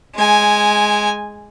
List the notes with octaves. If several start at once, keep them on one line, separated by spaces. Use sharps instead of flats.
G#3 G#5